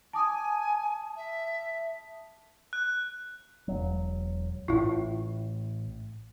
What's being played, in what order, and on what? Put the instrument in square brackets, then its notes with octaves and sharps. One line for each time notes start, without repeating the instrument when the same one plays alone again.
[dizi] G#5 [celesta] A5 D6 D#6
[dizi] E5
[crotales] F#6
[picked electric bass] E1 F#3
[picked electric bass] A1 A2 [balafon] E4 F4